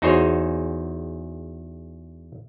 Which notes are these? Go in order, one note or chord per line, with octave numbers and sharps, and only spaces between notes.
E2 D#4 F#4 G#4 C5 C#5